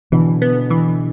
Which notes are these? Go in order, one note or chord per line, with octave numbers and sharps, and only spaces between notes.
B2 D3 E3
B3
E3